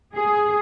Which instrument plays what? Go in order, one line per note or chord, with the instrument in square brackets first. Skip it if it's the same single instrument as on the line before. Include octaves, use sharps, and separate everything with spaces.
[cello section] G#4